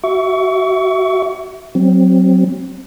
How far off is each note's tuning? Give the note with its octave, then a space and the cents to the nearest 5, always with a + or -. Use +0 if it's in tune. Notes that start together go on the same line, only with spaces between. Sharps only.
F#4 +25 E5 +0 C#6 +30
F#3 +10 C4 +0